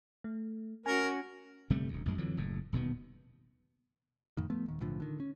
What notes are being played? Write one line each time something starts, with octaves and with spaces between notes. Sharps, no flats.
A3
C#4 F#4 A#4 G#5
G1 C3 G3 A3
E1 D2
A#1 F#2 G#3
F2 D3 E3 F#3
F#1 A2
D#1 B2 D#3 B3
F2 A2 D#3
F3 A3 B3
D#1 D#3
B1 A2 D3 F3
D3 D#3
C#4